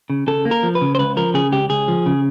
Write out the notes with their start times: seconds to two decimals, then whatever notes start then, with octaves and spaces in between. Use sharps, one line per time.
0.10 C#3
0.27 C#3 A4
0.45 A#3
0.51 A#4
0.63 F3
0.75 B4
0.81 C#3
0.95 C5
0.99 C#2 B4
1.17 F3 A#4
1.34 C#3 G#4
1.52 C#2 G4
1.70 C#2 G#4
1.88 F3
2.06 C#3